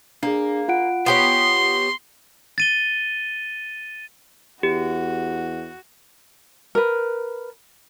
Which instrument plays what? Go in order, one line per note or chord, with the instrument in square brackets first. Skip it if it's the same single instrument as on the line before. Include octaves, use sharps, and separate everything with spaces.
[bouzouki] A#3 [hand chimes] D4 G#4
[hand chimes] F4 F#5 D7
[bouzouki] B3 G4 C#5 [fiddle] C6
[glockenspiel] A6 D#7 G7
[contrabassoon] E2 [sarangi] F#4 [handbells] G4
[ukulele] A#4 B4